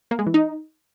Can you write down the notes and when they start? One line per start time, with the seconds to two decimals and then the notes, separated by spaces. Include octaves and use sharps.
0.11 A#3
0.19 G#3
0.26 E3
0.34 D#4